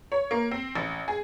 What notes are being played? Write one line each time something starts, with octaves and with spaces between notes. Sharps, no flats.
C#5
A#3
C4
A1
G#4